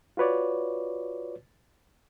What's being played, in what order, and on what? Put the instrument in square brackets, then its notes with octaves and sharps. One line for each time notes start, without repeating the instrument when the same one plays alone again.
[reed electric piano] F4 F#4 B4 C#5 D5